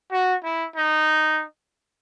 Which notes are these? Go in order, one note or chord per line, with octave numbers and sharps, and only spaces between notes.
F#4
E4
D#4